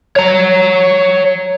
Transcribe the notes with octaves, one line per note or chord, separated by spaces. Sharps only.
C#5 A#5